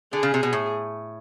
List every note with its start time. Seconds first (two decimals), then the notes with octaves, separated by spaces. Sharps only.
0.13 D3 G#4
0.23 C#3
0.34 C3
0.43 B2
0.53 A2